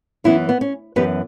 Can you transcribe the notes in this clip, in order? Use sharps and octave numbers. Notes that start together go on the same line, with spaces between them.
F#2 E3 B3 C#4 E4
B3
C#4
F#2 E3 B3 G4 B4